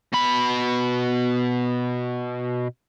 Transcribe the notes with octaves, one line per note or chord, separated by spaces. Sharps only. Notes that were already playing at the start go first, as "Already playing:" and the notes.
B2 B5